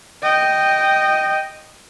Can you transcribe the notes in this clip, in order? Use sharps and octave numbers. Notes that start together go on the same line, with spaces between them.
D#5 G5